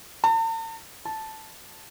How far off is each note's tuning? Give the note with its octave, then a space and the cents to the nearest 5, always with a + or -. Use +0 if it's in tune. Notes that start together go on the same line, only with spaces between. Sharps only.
A5 +45
A5 -5